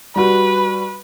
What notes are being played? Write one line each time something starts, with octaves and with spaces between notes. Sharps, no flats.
G3 F#4 B4